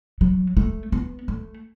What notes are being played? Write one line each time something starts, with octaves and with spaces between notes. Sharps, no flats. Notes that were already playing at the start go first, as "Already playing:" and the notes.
F#3
A3
B3
A3